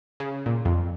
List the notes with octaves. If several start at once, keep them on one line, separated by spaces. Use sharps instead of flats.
C#3
A#2
F2